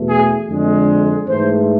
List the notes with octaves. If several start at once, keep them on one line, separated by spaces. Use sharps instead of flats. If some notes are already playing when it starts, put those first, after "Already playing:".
Already playing: E2 B2 A3
G#4
F2 D3 G#3
G#2 E3 A3 C5